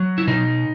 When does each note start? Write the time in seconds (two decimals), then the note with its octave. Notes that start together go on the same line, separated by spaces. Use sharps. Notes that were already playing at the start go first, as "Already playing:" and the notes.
Already playing: F#3
0.18 E4
0.27 B2 D#4